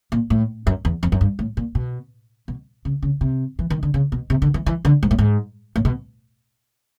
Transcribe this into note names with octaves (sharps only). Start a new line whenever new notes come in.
A#2
A2
F#2
E2
F2
F#2
G2
A2
A#2
B2
B2
C#3
C#3
C3
E3
D#3
D3
C#3
B2
C3
D3
E3
E3
D3
G#2
A2
G#2
A2
B2